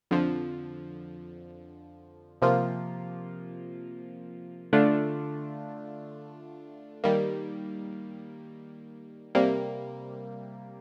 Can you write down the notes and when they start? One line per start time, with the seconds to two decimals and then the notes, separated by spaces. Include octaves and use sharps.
0.11 F2 D3 F3
2.42 C3 F3 A#3 F4
4.73 D3 A3 D4 F4
7.04 D#3 G3 A#3
9.35 C3 G3 A#3